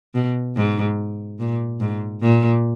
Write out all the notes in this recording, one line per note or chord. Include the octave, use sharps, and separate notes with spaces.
B2
G#2
A#2
G#2
A#2